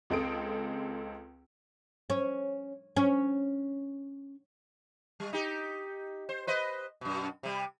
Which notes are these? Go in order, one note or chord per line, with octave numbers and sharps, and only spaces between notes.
C#2 G#3 C4 A4 D#6 D7
C#4
C#4
G3
D#4 G4
C5
B4 C5 D#5
F#2 B2
C3 G3